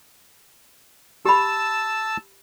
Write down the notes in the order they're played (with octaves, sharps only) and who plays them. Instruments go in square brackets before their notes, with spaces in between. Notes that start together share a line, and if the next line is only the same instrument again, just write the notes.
[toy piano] G4 B5 [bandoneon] A5 E6